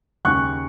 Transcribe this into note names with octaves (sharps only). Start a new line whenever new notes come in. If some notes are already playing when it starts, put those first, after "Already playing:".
D#2 C#3 G#3 C#6 F#6